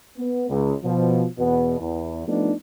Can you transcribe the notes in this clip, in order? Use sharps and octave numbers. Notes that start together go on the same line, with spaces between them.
B3
C#2
B2 F3
E2 B2 B3
E2
F3 A3 B3 D4 D#4